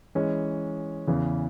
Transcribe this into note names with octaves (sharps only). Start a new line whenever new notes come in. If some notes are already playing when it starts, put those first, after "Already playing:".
E3 G#3 C#4
E2 C#3 E3